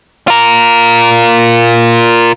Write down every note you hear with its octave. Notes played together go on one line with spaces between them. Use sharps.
F4 A#4